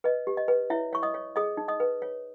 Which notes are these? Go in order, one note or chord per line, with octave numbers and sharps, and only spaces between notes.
B4 D#5
G4
D#5
B4
E4 C#5 E5
C#5 C#6
D#5 D#6
C#5
G#4 D#5 D#6
D#4
D#5 D#6
B4
C#5